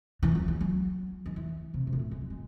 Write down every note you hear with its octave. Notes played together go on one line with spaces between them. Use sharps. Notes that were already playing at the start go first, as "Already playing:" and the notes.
E3
F#3
G#3
F#3
D#3
E3
C3
C3
A2
G#3
F#3
G#3